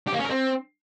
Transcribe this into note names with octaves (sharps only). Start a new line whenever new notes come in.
G4
A#3
C#4
A#4
C4